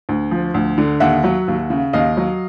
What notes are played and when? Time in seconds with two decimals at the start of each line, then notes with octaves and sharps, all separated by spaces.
0.09 D2
0.31 F3
0.54 D2
0.78 D3
1.00 D#2 E5 F#5
1.24 F#3
1.48 D#2
1.70 C#3
1.93 D#2 D#5 F5
2.17 F#3